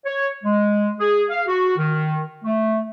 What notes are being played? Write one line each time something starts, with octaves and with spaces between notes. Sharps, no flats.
C#5
G#3
G#4
F5
F#4
D#3
A3